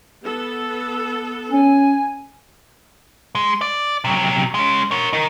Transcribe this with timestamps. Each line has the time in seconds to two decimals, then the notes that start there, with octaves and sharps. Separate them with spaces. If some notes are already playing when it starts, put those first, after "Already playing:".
0.23 B3 A4
1.51 C#4 G#5
3.35 G#3
3.61 D5
4.05 C3 F#3
4.55 G#3 C#4
4.91 A#4 C#5
5.13 D#4 A#4